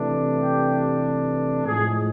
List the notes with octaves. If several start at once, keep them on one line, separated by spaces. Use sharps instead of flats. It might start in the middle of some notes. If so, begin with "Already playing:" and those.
Already playing: C3 E3 A3 D4
G4
A2 F3 G#3 G#4